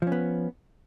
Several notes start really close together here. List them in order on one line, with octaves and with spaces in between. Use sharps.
F3 C#4 B3